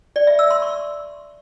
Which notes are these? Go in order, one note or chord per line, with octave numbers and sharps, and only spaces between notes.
D5
E5
E6
C6
C#6